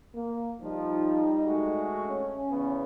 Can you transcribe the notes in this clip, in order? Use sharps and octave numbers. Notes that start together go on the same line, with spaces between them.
A#3
F3 G3 D#4
G#3 A3 F#4
C#4
E2 C#3 B3